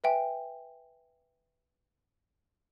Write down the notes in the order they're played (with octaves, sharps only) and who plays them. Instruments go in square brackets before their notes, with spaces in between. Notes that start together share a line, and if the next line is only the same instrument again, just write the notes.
[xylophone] B4 E5 G5 G#5